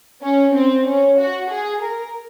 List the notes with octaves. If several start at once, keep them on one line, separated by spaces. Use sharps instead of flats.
C#4
C4
C#4
F#4
G#4
A#4